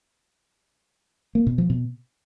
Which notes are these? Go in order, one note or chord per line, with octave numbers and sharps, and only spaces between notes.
A#3
B2
F3
B2